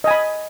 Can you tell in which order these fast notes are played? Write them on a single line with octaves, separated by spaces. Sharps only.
D#5 G#5 B5